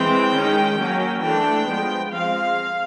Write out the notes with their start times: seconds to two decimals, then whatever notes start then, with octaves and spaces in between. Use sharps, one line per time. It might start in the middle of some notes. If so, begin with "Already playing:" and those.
Already playing: E3 G#3 C4 G5
0.34 D#3 G#3 C#4
0.79 F#3 A#3 C#4
1.23 E3 A3 D4 G5
1.68 F3 G#3 B3
2.12 F3 G#3 C4 F5